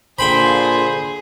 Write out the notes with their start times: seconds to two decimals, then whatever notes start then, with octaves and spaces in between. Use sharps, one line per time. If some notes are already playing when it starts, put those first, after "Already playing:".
0.19 A#2 D3 G#4 C5 G5 B5